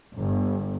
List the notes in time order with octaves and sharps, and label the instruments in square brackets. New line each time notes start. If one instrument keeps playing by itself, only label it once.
[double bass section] G1